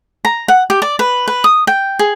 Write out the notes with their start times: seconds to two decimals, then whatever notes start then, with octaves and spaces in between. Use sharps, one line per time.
0.25 A#5
0.48 F#5
0.70 G4
0.82 D5
0.99 B4
1.28 B4
1.44 D#6
1.67 G5
1.99 G#4